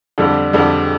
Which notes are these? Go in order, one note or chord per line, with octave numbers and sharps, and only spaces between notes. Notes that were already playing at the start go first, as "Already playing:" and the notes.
F2 D3 G3
F2 D3 G3